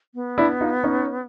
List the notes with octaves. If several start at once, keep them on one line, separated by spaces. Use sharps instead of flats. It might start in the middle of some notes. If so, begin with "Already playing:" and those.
B3
D4 E4
D#4 F4
C#4 D#4